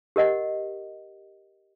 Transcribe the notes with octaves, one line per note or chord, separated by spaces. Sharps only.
G4 A#4 D#5 F#5